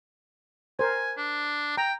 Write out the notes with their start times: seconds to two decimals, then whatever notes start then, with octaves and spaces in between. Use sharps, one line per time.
0.79 A#4 C5 G#5
1.17 D4
1.77 G5 A#5